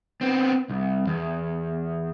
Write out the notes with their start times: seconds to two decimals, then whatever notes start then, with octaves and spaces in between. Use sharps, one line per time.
0.21 B3 C4
0.69 C2
1.07 E2